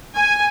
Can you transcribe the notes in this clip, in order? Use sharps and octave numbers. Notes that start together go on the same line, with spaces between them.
G#5